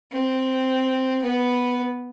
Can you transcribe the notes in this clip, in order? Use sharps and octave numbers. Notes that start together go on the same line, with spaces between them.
C4
B3 B4